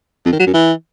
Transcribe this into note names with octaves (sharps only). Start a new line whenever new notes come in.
F2
D#3
F#3
F#2
E3